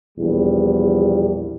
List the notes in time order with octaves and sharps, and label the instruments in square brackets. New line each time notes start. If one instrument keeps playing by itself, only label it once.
[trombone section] A#1 E2 B2 G3